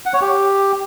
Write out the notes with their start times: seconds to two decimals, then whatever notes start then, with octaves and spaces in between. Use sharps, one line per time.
0.06 F#5
0.13 C#5
0.21 G4